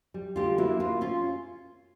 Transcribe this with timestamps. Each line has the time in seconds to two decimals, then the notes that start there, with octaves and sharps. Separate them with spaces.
0.14 G3
0.36 D3 F4 G4
0.58 A#3 E4 F#4
0.80 A#3 F4
1.01 C#4 F4